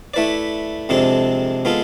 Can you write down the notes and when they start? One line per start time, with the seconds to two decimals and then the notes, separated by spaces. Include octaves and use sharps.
0.14 A3 E4 B4 D5
0.89 F2 C3 G#3 D4 A4
1.65 G#3 B3 F4 A4